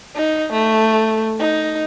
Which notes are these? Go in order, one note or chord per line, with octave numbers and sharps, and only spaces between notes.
D#4
A3
D#4